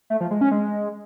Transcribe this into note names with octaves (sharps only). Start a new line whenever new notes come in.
A3
F3
G#3
C#4
G#3